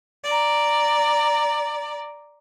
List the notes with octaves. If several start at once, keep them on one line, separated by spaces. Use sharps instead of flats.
D5 A#5